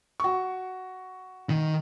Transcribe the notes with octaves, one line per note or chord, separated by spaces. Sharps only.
F#4 C#6
D#3